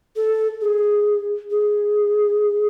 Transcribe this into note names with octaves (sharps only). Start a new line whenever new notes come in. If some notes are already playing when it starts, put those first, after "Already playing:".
A4
G#4
G#4